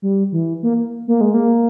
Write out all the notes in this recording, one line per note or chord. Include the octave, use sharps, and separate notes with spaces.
G3
E3
A#3
A#3
G#3
A#3